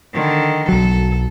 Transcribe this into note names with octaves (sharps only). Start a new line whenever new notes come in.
D3 D#3
B1 F#3 A4